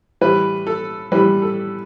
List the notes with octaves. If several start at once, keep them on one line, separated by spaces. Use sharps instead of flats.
A2 E3 G3 B4
A4
A2 E3 G3 B4
A4